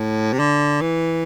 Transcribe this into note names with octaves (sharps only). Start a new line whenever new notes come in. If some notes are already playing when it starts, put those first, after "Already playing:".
Already playing: A2
C3
D3
E3